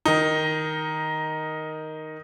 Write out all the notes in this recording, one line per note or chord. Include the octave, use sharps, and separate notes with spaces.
D#3 D#4